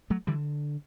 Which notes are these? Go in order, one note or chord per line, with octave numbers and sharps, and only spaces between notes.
F#3 A3
D3 E3 G3